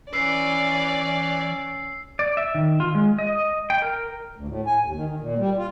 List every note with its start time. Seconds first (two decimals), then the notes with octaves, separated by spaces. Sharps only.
0.13 E3 C#4 B4 D5 E6 C7
2.19 D5
2.37 E5
2.55 D#3
2.80 F4
2.95 G#3
3.19 D#5
3.70 G5
3.82 A#4
4.36 D2
4.48 A2
4.66 G#5
4.83 D#2
4.94 D#3
5.06 D#3
5.20 A#2
5.39 G3
5.57 F4